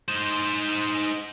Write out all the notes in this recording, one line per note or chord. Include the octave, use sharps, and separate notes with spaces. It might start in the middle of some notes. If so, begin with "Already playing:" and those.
D#4 C5